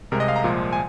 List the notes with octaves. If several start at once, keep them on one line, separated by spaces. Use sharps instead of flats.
C2 C3 G#3 A#4
D#5
F5
A#5
C2 A#2 F3 G#3
G#5